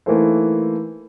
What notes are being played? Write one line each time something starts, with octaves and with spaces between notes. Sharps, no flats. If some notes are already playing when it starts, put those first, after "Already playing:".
E3 A3 A#3 D#4 A4 C5